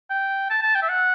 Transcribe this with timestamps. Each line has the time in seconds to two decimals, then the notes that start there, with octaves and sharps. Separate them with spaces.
0.10 G5
0.50 A5
0.63 A5
0.75 G5
0.82 E5
0.89 F#5